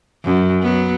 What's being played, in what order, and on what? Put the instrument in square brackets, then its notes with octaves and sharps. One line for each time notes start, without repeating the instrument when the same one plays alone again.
[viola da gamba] F#2
F#3 B3